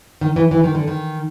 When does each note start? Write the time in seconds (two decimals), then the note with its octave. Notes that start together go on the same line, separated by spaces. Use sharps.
0.21 D#3
0.36 E3
0.51 E3
0.64 D#3
0.75 D3
0.88 D#3